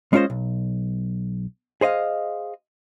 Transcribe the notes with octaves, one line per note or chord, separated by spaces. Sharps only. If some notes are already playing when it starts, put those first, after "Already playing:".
G#3 C#4 F4 A#4 C5 D#5
B1
G#4 C5 D#5 F5